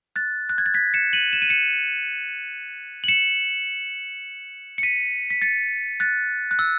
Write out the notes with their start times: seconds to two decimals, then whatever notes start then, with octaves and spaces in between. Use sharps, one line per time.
0.16 F#6 A6
0.50 F#6
0.58 G#6
0.66 A6
0.74 G#6 B6
0.94 C#7 E7
1.13 D#7 F#7
1.33 E7
1.42 D#7
1.49 C#7 E7
3.04 F#7
3.08 C#7 E7
4.78 C#7
4.83 B6 D#7
5.30 B6
5.42 A6 C#7
6.00 F#6 A6
6.51 F#6
6.59 E6